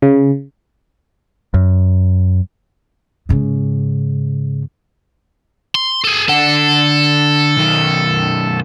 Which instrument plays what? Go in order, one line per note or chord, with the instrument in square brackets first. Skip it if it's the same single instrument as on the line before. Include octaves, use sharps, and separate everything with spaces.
[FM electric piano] C#3
[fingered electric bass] F#2
[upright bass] G#2 C#3
[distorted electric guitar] C6
G#4 A4
[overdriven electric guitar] D3 F#5 [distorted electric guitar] A4
[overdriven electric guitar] B1 D#3